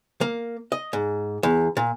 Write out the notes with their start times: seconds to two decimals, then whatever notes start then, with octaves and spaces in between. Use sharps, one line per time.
0.21 A#3
0.72 D#5
0.93 G#2
1.43 E2
1.77 A#2